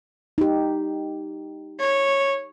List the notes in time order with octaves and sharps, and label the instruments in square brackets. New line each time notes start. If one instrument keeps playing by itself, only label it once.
[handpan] D#4 G4
[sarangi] C#5